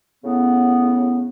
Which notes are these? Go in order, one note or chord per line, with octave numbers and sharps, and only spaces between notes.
A2 C#3 B3